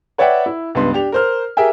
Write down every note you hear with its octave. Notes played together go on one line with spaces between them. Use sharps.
B4 C#5 D5 E5 F#5 G5
E4
C#2 G2 B3 C6
D4 G4 F7
A#4 C5 F6
G4 G#4 A#4 E5 G5 G#5